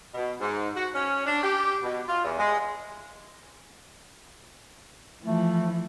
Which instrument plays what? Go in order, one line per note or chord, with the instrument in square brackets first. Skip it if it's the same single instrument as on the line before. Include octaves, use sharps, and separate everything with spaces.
[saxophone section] B2
G#2
F#4
C#4
D4
G4
B2
F4
E2
G#3
[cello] E3 F3 [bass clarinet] A3